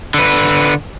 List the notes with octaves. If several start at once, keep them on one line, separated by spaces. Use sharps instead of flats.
D3 B4